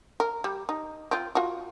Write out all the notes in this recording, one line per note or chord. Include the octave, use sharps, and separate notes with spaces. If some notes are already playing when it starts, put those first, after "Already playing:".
A#4
G3
D#4
C4 F4
F4 F#4